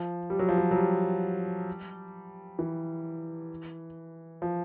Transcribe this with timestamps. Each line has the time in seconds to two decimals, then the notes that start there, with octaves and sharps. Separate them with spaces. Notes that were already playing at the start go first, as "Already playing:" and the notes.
Already playing: F3
0.30 G3
0.39 F#3
0.49 F3
0.58 F#3
0.71 F#3
0.76 G3
2.59 E3
4.42 F3